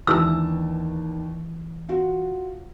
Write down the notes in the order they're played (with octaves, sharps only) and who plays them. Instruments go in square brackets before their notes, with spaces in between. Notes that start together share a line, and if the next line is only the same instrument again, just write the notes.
[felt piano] D#2 D4 A5 [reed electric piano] E3 [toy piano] E6
[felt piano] F4 F#4